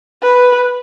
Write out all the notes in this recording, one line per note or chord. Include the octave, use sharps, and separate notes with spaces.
B4